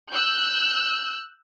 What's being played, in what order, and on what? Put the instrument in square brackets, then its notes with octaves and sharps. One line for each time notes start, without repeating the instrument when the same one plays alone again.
[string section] E6 F#6 G6